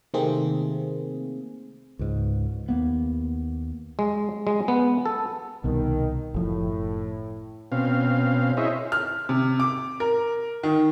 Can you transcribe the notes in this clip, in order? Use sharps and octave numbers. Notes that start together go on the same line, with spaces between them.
C3 D#3 A3 A#3 C4 G#4
C#2 G#2
D#2 A#3 B3
G#3
G#3
B3
A4
C2 B2 D#3
F#1 A2 F3
B2 C4 C#4 F5
E4 G#4 C5 C#5 D#5 E5
F6
C3
D6
A#4
D#3